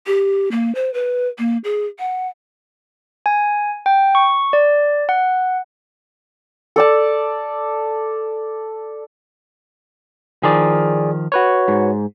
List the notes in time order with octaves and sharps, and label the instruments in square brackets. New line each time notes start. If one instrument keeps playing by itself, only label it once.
[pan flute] G4
A#3
C5
B4
A#3
G#4
F#5
[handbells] G#5
G5
C#6
D5
F#5
[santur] A4 D5 A5
[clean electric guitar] D#3 F3 [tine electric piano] G#4 D5
[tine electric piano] F#4 B4 C#5
[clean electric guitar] G#2